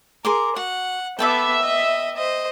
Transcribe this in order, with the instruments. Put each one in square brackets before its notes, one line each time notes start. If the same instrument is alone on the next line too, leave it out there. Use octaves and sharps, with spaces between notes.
[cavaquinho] G#4 C6 D6 [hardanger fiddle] A#4
[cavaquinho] F#4 [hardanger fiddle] F#5
[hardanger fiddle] B3 A4 [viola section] E5 [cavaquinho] G5 B5 D6
[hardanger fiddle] D#5
C5 D#5